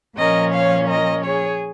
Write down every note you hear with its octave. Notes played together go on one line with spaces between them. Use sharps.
A#2 F3 C#4 A#4 D#5
C#5 F5
A#4 D#5
G#4 C#5